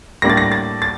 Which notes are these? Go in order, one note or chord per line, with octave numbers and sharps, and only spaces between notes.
A2 G3 A#3 D4 A#6
A6
A#6
A6
A6